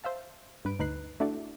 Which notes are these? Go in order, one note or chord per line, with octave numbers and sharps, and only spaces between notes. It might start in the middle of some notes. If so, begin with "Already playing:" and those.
C5 E5 F5 A5
G2 B4 D7
D2 D#4 B4 F#6 C7
A3 D4 E4 F#4 D5